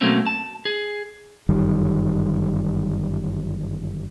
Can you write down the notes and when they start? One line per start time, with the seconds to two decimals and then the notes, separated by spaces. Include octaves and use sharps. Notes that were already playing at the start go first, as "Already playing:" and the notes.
0.01 B2 F#3 A3 A#3 C4 C#4
0.27 A5
0.65 G#4
1.49 G1 F#2 D#3 G3